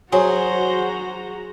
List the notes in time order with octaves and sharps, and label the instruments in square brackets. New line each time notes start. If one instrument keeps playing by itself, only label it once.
[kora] F#3 [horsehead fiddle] F#4 A#5 [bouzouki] G#4 [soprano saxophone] C5